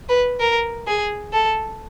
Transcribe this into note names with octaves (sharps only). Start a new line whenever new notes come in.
B4
A#4
G#4
A4